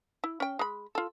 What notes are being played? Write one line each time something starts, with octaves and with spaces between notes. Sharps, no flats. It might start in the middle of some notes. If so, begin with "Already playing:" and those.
E4
C#4 G5
G#3 B5
F4 A4